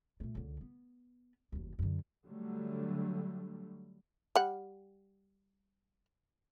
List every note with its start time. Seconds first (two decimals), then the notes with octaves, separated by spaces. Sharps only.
0.20 A#2 A3
0.35 C#2 D3
0.61 B3
1.52 F#1 D#2
1.79 F#2 D3
2.26 D3 F#3 G3 A3
4.36 G3 F#5